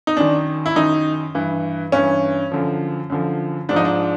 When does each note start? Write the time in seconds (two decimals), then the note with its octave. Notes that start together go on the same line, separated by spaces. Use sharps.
0.07 D#4
0.17 F#2 D#3 D4
0.66 E4
0.75 F#2 D#3 D#4
1.35 G2 E3
1.92 G2 E3 C#4
2.52 F#2 D3 F3
3.10 F#2 D3 F3
3.69 G#2 D4
3.73 F3 D#4
3.85 D4